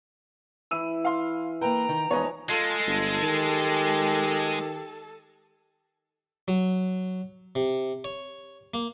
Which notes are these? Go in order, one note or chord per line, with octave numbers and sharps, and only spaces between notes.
E3 B5 E6 D#7
F5 C6
A#3 B4 G5 A#5
D#3
E2 F3 G#3 D#4 B4 C#5 G#5
G#3 F4 A4 A5
G1 F4
D#3 G4
F#3
C3
C#5
A#3